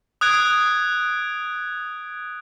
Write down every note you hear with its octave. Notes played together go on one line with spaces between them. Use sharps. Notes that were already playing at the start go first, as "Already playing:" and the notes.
D#6 F#6 G#6 D7